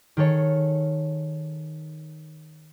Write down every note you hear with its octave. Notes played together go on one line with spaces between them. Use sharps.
D#3 G#4 A4 C#5